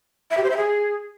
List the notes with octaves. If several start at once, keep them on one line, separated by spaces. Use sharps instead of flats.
E5
G4
C5
E5
G#4